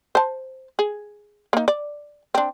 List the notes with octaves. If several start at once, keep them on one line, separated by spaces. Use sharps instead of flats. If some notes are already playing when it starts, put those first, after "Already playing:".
C5 A5
G#4
A#3 D#4
D5
C4 D4